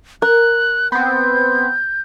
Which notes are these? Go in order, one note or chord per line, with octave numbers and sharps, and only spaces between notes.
A#4 F#6
B3 C4 G6